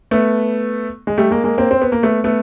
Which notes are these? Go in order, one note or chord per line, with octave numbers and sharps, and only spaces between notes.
A3 B3
G#3
G3 A3
G#3 A#3
G#3 A#3
A#3 C4
C4
B3
A#3
A3 B3
A3 B3